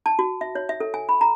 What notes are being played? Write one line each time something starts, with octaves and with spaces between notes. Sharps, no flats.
A5
F#4
E5
C#5
E5
A4
G#5
B5
A#5